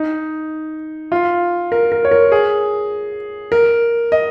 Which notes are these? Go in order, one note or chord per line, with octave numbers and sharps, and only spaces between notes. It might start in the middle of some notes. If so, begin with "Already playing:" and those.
Already playing: D#4
F4
A#4
A#4
C#5
A#4
G#4
A#4
D#5